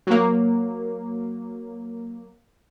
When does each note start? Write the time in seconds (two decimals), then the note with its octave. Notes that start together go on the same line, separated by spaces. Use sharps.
0.07 F#3 A#3